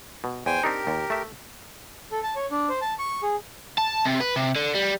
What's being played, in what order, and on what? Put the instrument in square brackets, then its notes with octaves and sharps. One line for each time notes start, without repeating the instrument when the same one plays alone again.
[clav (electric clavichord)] B2
[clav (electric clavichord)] E2 [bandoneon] C5 G5 G#5
[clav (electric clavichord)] C4 D4 D#4 [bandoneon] G4 A#4
[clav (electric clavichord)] D#2
A3 E5
[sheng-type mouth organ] A4
A5
C#5
D4
C5
A5
C#6
G#4
[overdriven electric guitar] A5
C3
B4
C3
D3
G3